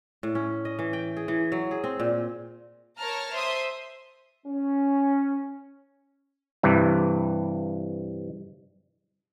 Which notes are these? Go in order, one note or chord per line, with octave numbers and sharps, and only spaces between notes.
A2
C#4
D#5
E3
G5
G#4
E3
F#3
G#4
C4
A#2
A#4 C#5 A5 A#5 F6
C5 E5 C6 D#6
C#4
G2 C3 E3